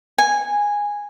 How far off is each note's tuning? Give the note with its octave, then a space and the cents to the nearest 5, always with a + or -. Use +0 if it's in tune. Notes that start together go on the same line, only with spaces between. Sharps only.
G#5 -10